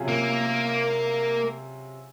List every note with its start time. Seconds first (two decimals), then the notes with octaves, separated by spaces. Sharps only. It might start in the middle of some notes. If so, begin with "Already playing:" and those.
Already playing: C3 F#3 C#4 F4 G#4
0.09 A#3